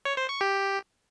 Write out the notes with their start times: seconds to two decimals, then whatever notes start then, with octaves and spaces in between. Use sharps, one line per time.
0.05 C#5
0.17 C5
0.29 C#6
0.41 G4